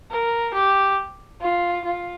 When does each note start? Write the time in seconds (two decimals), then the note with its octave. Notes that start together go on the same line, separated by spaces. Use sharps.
0.11 A#4
0.54 G4
1.41 F4
1.85 F4